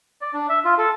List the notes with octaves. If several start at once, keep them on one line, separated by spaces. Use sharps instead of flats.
D5
D4
E5
F4
A4